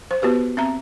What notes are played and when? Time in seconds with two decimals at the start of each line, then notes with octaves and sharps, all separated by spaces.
0.11 C5
0.22 B3 F#4 G4 B4
0.57 C4 E5 A#5